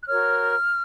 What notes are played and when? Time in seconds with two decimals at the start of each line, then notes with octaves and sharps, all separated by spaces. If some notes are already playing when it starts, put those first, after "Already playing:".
0.03 F#6
0.08 F#4 A#4 C#5 F6